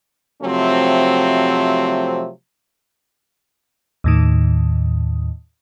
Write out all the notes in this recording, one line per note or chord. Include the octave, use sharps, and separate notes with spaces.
C3 F3 F#3 A3 C4
D#2 A2 D#3